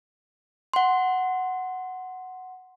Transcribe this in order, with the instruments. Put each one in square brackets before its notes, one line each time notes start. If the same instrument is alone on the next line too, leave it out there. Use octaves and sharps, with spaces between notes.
[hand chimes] F#5 C6